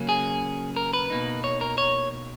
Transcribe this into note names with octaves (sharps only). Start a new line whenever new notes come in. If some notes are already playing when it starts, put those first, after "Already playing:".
Already playing: C#3 F#3 A#3 C#4
G#4
A#4
B4
B2 A#3 D#4
C#5
A#4
C#5